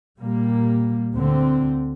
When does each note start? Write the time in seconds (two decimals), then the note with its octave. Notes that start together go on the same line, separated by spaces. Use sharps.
0.19 A#2 G3 A#3
1.13 D2 D3 C4